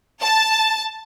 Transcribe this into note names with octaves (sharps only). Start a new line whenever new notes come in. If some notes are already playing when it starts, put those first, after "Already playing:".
A5